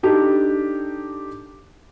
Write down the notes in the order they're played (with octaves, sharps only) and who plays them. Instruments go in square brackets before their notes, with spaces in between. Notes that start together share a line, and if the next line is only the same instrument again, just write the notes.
[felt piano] D4 D#4 G4 A4